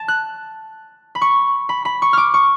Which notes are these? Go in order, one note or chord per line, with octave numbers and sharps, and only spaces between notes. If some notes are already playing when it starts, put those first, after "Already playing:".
Already playing: A5
F#6
B5
C#6
B5
B5
C#6
D6 F6
C#6